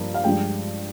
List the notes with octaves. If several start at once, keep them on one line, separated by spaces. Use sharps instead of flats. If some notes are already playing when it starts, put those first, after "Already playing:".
Already playing: G2 F3 A#3
F5
G2 F3 G#3 G5